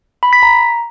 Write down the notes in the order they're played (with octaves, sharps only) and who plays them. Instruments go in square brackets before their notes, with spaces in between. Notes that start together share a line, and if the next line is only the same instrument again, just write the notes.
[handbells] B5
B6
A#5